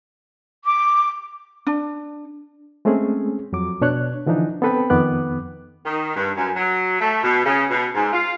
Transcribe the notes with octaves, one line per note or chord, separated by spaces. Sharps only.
D6
D4
G#3 A3 C4 C#4 G#4
F2 F#3 D6
B2 D4 C#5 F#6
D3 E3 F3 D4 D#4
B3 C4 A4 B4 G5 B5
F2 D#3 B3 D6 F#6
D#3
G2
F#2
F#3
A3
B2
C#3
B2
G#2
F4